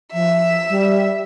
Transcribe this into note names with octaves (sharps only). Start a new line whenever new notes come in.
F3 E5
G3